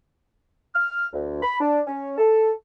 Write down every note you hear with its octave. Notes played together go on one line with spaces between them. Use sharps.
F6
D2
B5
D4
C#4
A4